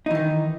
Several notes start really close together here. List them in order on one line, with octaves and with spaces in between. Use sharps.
D#4 E3 D#3